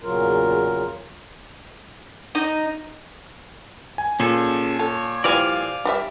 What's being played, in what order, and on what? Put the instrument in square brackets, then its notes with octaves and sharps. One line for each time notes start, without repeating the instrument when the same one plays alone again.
[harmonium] E2 A#2 C#3 F#3 F4 A#4
[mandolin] D#4
[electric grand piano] G#5
[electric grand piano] A#2 [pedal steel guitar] C#4 G#4 A4
[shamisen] A4 [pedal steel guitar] C#5
[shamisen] E3 F3 G3 [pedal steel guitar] D5 F5 G#5
[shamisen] G3 G4 E5